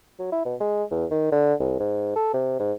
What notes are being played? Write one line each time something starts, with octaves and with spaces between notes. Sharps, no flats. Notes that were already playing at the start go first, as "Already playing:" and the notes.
F#3
E4
B2
G#3
E2
D#3
D3
C2
G#2
A4
C3
G#2